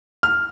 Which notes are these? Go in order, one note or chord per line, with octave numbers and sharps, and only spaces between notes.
F6